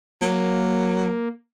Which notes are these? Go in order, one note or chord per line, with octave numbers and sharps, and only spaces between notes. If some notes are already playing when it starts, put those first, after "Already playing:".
F#3 A#3